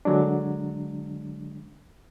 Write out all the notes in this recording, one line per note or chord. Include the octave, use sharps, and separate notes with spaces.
D3 F#3 G#3 D4